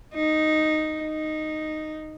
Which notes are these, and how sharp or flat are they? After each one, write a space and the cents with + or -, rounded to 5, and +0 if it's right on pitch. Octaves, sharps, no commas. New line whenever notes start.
D#4 -5
D#4 -5